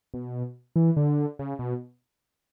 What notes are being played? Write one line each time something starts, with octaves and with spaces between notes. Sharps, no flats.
B2
E3
D3
C#3
B2